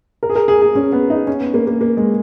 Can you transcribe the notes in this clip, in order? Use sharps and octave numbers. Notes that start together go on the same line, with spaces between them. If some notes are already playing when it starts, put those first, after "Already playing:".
A#4
G#4
A#4
G#4
G#4
C#4
B3
D#4
C#4
B3
A#3
A#3
A#3
G#3